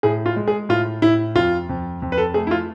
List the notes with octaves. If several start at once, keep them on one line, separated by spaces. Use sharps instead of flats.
A2 G#4
F4
G#3
G#4
A2 F4
A2 E4
F2 F4
F2
F2
B4
A4
A3 G#4
E4
F4